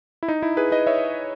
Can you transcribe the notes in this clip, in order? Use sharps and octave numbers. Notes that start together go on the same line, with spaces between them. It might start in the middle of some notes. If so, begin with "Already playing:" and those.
E4
D#4
E4
G#4 B4
B4 D#5
C#5 E5